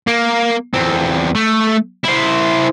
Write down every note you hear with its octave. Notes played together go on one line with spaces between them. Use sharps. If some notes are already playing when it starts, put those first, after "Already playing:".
A#3
E2 C4
A3
E4 C5